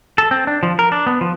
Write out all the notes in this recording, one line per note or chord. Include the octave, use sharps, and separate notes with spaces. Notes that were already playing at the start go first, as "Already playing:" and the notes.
A4
C4
D4
F3
A#4
D4
B3
F3